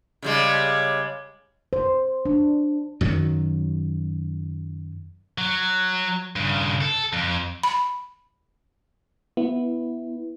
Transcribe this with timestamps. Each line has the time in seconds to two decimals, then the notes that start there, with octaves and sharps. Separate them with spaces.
0.22 C#3 G3 G#3
1.73 C5
2.26 D4
3.01 F#2 D#3 F#3
5.38 F#3
6.36 G2 C#3
6.81 A4
7.13 F2
7.63 B5
9.37 B3 E4